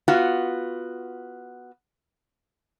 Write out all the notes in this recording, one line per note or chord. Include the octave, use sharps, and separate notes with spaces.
B3 F4 F#4